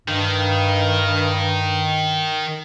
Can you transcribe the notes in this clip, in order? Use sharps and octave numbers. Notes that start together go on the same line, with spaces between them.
G2 D#3